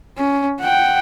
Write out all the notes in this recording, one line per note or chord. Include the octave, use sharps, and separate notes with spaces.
C#4
F#5 G5